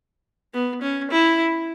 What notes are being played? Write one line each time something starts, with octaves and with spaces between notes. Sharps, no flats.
B3
C#4
E4